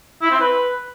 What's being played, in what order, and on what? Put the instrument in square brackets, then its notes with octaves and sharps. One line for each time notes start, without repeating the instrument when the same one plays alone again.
[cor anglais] E4
C4
B4